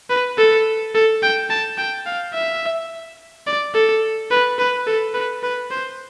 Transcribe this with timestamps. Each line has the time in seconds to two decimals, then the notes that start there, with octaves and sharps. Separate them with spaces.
0.10 B4
0.38 A4
0.95 A4
1.23 G5
1.50 A5
1.78 G5
2.06 F5
2.34 E5
3.47 D5
3.74 A4
4.31 B4
4.58 B4
4.87 A4
5.14 B4
5.43 B4
5.71 C5